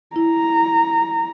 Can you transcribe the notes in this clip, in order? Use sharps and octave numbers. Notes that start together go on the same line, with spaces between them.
E4 A#5